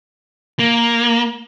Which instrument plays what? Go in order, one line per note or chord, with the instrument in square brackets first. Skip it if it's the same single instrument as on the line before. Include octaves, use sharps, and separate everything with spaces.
[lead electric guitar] A#3